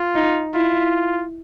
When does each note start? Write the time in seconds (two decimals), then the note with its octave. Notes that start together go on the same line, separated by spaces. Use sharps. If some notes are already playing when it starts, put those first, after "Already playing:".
Already playing: F4
0.15 D#4
0.54 E4 F4